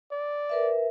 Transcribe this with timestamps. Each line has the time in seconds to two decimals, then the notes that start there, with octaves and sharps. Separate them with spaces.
0.11 D5
0.50 A#4 B4 E5